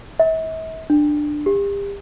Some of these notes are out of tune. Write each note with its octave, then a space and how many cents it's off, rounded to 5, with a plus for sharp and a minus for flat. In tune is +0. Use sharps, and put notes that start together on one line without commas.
E5 -45
D4 +15
G4 +35